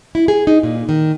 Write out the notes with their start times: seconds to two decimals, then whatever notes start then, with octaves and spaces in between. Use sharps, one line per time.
0.15 E4
0.28 G#4
0.47 D#4
0.63 A#2
0.89 D#3